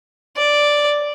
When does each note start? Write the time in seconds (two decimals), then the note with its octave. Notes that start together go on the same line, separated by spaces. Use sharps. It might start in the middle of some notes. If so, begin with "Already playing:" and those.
0.37 D5